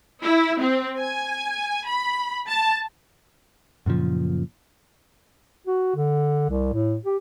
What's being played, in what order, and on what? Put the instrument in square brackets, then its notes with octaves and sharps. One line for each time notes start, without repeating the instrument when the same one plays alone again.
[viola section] E4
C4
G#5
B5
A5
[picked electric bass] F#2 A#2 C#3 F3
[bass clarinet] F#4
D3
C2
A2
G4